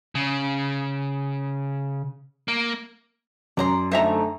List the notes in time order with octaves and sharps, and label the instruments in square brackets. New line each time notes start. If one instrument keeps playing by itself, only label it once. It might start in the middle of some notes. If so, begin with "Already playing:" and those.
[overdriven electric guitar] C#3
A#3
[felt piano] F#2 [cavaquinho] D5 A#5 C6
[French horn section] D3 A3 [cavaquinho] D#4 [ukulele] C5 E5 A#5